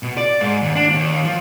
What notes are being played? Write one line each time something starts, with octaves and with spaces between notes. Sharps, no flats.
B2
D5
G#2
D#2
D4
D#2
F3